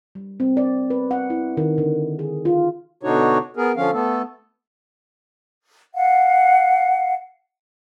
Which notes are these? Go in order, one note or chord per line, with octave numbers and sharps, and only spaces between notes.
G3
C4
D5
B4
F#5
E4
D#3
D3
G#4
F4
B2 D3 D4 D#4 F#4 C#5
B3 G#4 A#4
D3 F3 C#4 F5
A3 B3 A4
F5 F#5